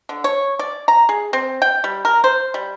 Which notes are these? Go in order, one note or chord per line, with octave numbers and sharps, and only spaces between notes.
D3
C#5
D5
A#5
G#4
C4
G5
G3
A#4
C5
G3